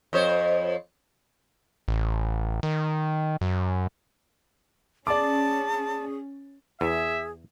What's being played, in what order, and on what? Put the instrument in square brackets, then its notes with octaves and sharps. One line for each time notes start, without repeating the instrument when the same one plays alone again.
[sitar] F2 C5 C#5
[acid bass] A1
D#3
F#2
[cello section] C#4 [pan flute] G#4 [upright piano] D5 D6 [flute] A5
[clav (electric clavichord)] E2 [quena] G#4 [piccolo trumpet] E5